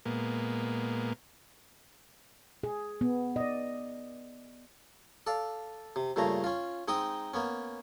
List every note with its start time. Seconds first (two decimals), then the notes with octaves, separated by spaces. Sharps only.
0.06 A#2 G#3 A#3 B3
2.63 G#4
3.01 B3
3.36 D5 D#5
5.27 A4 D5 F5
5.96 C3
6.16 G2 A#2 C#3 A3 A#5
6.44 C#4 F4
6.88 G#3 C4 D#4 G5 D#6
7.34 A#3 B3 C#4